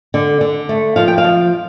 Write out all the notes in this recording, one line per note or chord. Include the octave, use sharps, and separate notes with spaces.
D3
D3
A3
F3 F5
G5
F5
F3